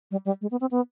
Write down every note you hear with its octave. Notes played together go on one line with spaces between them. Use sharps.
G3
G3
G#3
B3
C4
B3